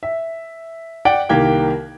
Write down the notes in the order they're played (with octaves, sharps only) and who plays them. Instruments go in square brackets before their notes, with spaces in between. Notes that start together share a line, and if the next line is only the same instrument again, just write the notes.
[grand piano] E5
D5 F#5 G5 D7
C2 D#3 A#3 G4 G5 G#6